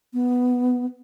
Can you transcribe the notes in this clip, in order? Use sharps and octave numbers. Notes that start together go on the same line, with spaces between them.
B3